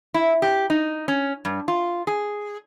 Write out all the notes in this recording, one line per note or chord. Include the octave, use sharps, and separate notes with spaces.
E4
G4
D#4
C#4
G2
F4
G#4